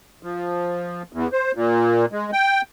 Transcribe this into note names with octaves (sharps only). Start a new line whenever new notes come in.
F3
E2
C5
A#2
G#3
G5